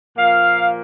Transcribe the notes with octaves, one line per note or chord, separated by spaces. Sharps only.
A#2 F3 A#3 F5